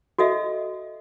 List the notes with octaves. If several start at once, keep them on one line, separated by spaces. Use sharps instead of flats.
F#4 A4 D#5 E5